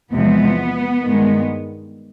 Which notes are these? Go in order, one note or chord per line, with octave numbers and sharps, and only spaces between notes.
E2 C3 F3 G#3 B3
G2 D#3 G#3